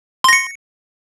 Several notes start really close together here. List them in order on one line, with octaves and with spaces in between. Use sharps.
C6 A#6 C#7